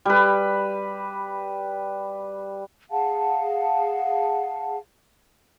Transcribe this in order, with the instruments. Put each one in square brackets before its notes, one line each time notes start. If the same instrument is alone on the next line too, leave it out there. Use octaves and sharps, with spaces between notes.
[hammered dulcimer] G3 B4
[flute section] G#4 F5 F#5 A5